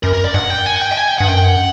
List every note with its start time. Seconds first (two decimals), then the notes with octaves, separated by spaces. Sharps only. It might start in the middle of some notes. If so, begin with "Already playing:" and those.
0.03 F#2 A#4
0.13 A#4
0.24 D5
0.34 G2 F#5
0.50 G5
0.66 G#5
0.76 F#5
0.81 G5
0.92 G5
0.97 G#5
1.08 G5
1.18 G2 F#5
1.28 F#2 G5
1.44 F#5